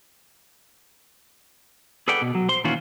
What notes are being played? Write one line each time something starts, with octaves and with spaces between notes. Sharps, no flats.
G#4 A4 B4 D5 F#5 G5
B2
F#3
C5 C6
A#2 D#3 E3 C#4 F4 F#4